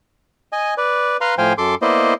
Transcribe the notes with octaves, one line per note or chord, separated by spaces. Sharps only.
D#5 G#5
B4 D5
B4 F5 A#5 C6
A2 F3 C5 F5 G5 G#5
F#2 A4 C6 D6
A#3 B3 E4 C5 D5 D#5